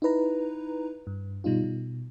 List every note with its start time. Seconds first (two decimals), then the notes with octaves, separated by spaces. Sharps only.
0.02 D#4 E4 B4 A#5
1.07 G2
1.44 B2 G3 D#4 F4
1.64 B2